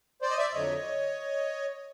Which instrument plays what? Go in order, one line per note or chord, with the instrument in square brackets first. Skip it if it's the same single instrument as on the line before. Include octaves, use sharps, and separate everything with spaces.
[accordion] C5 D5
D#5
D5 E5
E5
F2 D3 F#3 C#5 D#5